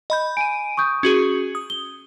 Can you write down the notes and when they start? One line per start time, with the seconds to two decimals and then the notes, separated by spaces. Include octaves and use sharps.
0.10 D#5 B5 G6
0.37 G#5 D7 D#7
0.77 C#6 D#6 G6
1.03 C#4 F#4 G#4
1.55 D#6
1.70 G7